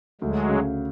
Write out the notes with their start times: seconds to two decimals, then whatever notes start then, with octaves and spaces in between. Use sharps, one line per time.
0.21 D2 F#3 G#3
0.49 C#3